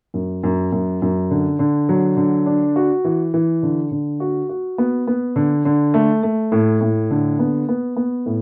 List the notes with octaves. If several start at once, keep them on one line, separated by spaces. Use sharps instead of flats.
F#2
F#2
F#2
F#2
D3
D3
F#3
D3
D4
F#4
E3
E3
D3
D3
F#4
F#4
B3
B3
D3
D3
A3
A3
A2
A2
D3
B3
B3
B3
A2